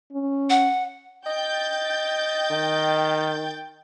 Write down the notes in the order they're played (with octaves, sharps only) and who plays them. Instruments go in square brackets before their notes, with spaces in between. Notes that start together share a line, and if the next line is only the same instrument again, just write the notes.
[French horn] C#4
[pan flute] F#5
[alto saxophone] D#5 [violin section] G5 G6 A6
[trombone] D#3